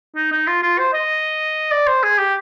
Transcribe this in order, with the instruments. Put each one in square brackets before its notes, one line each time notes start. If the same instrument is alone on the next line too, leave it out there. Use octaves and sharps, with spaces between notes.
[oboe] D#4
D#4
F4
F4
C5
D#5
D5
C5
G#4
G4